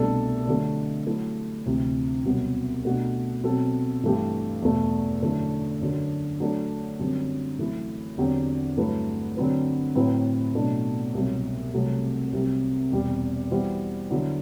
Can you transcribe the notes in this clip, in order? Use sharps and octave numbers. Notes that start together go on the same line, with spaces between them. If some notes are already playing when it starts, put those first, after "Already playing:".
Already playing: C2 B2 A3 D4 A4
D3 F#3 A3
F#3 A3 E4
D2 C3 E3
C2 B2 F#3 B3
B2 A3 D4 F#4
B2 F#3 C4 F#4 A4
G2 E3 A3 E4 G4
E2 B2 A3
F#2 D3 A3 E4
F#2 D3 F#3
F#3 A3 D4 A4
F#2 D3 G3 C4
F#2 E3 A3 E4
E2 D3 F#3 C4 G4
G2 F#3 A3 E4 B4
D3 F#3 C4 F#4 B4
A2 F#3 C4 E4 B4
B2 F#3 A3 D4
C2 B2 F#3
C2 C3 F#3 A3
C2 C3 F#3 C4 G4
E2 B2 G3 C4 G4
E3 G3 B3 F#4 C5
D3 F#3 B3 E4